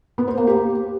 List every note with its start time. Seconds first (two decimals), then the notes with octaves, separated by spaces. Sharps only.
0.18 B3
0.28 C5
0.38 A#3
0.47 G4